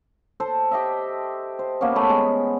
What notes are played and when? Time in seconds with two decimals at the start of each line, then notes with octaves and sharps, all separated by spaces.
0.40 A4 C5
0.71 G4 D#5 E5
1.59 C5
1.81 A#3 B3 C#4
1.95 A3 B5
2.10 G#3